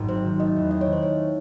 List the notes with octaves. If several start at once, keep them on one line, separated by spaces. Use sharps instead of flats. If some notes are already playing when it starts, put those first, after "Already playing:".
Already playing: G#1 G#2 F#3
C4 C5
D#3
A3 D#5
E2
C4 D#5
C#5
D#3
C5
A3 C#5